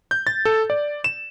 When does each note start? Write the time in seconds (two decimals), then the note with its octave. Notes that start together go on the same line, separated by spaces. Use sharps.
0.11 G6
0.27 A6
0.45 A4
0.70 D5
1.04 E7